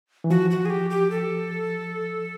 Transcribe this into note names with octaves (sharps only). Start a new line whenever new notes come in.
E3
F3 F#4
F#4
G#4
G4
G4
A4